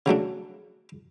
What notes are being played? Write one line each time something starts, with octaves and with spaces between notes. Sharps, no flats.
C#3 F#3 A3 D4